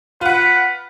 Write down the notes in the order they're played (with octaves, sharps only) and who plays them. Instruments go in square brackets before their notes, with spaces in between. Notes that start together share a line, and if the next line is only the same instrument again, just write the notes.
[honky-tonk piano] F4 F#5 [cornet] B4